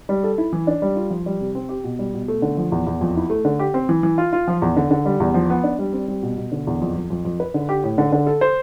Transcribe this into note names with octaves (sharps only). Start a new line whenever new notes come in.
G3
A4
E4
E3
D4
G3
F4
F3
G3
C3
C4
G4
B2
G3
B2
A3
D3
F3
E2
E2
F2
E4
A3
D3
G4
C4
E3
E3
F4
F4
F3
E2
D3
D3
G3
E2
F3
B3
D4
G3
C4
G3
B2
B2
D3
E2
F2
F2
F2
F2
B4
D3
G4
A2
D3
D3
A4
C5